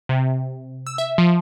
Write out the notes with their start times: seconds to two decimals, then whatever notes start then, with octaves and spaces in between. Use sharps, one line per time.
0.09 C3
0.87 E6
0.98 E5
1.18 F3